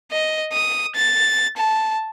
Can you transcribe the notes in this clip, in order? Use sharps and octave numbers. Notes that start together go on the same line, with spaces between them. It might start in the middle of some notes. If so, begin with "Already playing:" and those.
D#5
D#6
A6
A5